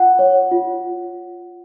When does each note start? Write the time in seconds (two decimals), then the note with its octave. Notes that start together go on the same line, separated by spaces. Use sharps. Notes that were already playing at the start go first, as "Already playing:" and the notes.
Already playing: F4 F#5
0.19 C#5
0.51 F4